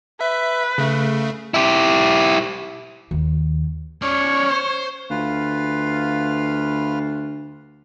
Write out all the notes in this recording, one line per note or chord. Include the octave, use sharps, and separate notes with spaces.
B4 E5
C#3 A3
E4 G4
D#2
C#4 C#5 D5
C5
D2 F4 B4 F5